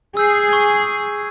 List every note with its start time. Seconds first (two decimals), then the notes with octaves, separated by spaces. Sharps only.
0.17 G#4 E6 G6 C7
0.49 C#6 G#6